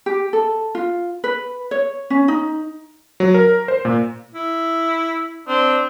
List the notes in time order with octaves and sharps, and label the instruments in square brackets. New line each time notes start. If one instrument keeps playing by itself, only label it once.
[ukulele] G4
A4
F4
B4
C#5
C#4
D#4
[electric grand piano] F#3
A#4
C5
A#2
[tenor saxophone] E4
[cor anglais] C4 [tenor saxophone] D4